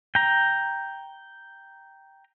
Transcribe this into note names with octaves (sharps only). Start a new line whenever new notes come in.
G5 A#5